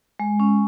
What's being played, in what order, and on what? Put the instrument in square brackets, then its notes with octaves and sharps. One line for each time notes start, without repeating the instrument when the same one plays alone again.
[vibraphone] G#3
C#4